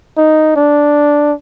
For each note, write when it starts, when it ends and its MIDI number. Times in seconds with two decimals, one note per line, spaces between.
0.18 0.56 63
0.56 1.33 62